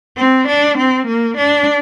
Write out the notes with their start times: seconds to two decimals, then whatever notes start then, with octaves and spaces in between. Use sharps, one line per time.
0.17 C4
0.48 D4
0.77 C4
1.07 A#3
1.37 D4